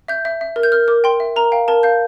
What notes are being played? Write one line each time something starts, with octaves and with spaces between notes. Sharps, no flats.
E5 G6
E5
E5
A#4
G6
A#4 F6
A#4 D6
G5 C6
E5
A#4 A#5
F5 G5
A#4 A5
F5 G6